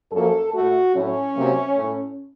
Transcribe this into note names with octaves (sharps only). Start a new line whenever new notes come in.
F#2 F3 A#3 A4
A2 A3 F#4
A2 F#3 A3 C#4
C3 F#3 A#3
A2 A3